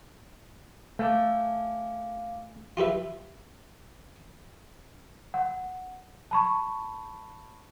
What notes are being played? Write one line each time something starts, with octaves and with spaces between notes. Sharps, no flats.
A3 F5 G#5 D6
F4 G4 B4 E5
F#5
A5 B5 C#6